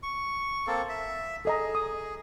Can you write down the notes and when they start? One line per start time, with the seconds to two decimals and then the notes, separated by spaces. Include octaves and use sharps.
0.03 C#6
0.67 A#3 C4 A4
0.89 E5
1.45 G#4 A4 D#5 A#5
1.75 D#6